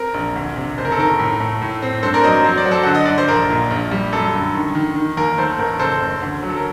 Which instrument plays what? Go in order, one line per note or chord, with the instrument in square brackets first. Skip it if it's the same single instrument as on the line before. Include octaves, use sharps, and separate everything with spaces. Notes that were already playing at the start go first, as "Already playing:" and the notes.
Already playing: [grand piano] C4 A#4
A#1
D2
C3
F#1 C5
A#4
A4
D#3 A#4
A2
A3
A2
C4
G2 A4 C5
A#4 D5
F#3 C5 D#5
F#3 C5
D5
F#3
A4 C5
D3 F#5
D#5
G2 D5
C5
A#1 A#4
A#2
A#1
G3
F#2 A4
D3
D#3
D#3
D#3
D#2 A#4
A3 A4 C5
A1 A#4
F#1 A4 C5
F#1
D2
F#3
A4
A#4